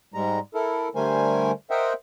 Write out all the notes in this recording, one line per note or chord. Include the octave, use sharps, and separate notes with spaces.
G#2 G3 G#3 A#5
E4 A4 A#4
D3 G3 A3 A#4 C5 G#5
A#4 C5 D#5 E5 F#5 G5